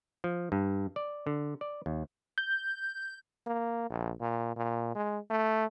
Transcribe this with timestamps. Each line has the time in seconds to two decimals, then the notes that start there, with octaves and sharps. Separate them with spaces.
0.24 F3
0.52 G2
0.96 D5
1.27 D3
1.61 D5
1.86 D#2
2.38 G6
3.47 A#3
3.90 A#1
4.20 A#2
4.56 A#2
4.95 G#3
5.30 A3